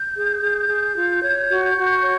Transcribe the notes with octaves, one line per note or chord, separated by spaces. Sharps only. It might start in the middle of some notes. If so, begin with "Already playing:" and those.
Already playing: G6
G#4
G#4
G#4
F4
C#5
F#4
F#4
C#5